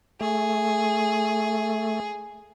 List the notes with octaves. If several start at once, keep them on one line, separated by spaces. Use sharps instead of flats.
A3 G#4